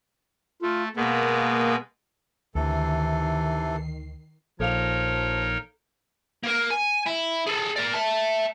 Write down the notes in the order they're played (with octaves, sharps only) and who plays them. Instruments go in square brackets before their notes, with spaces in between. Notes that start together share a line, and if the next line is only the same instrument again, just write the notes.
[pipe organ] A3 [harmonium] F4
[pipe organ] B2 G#3 B3 [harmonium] A#3
[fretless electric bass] D2 [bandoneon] C3 E3 A4 [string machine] D#3 C7
[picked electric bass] A#1 [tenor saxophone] F3 [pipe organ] D#4 A#4 C#5 [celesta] A4 F5 F7
[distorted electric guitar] A#3 A#4
G#5
E4
G#4 A4
A#4 D5
E5 A5